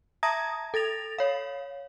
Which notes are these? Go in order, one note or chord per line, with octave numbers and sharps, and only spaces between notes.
E5 A5 A#5 D#6 G#6 A#6
A4 A6 A#6 F7
C#5 F5